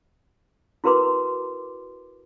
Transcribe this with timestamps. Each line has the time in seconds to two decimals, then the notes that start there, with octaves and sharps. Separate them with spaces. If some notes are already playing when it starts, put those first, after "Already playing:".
0.84 E4 F#4 A#4 B4 C6 D6